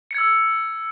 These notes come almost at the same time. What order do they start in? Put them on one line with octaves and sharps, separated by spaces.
C#7 G#6 E6